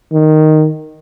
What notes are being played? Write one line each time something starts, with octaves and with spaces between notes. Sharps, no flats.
D#3